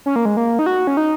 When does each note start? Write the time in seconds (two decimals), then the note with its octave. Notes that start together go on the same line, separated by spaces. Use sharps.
0.06 C#4
0.16 A#3
0.25 G#3
0.37 A#3
0.59 D#4
0.66 F#4
0.87 C#4
0.97 D#4